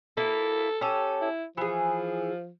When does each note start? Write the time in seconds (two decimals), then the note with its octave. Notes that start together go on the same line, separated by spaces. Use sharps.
0.17 A#3 E4 A4
0.81 C#4 G4 A4
1.21 E4
1.57 E3 F3 G#4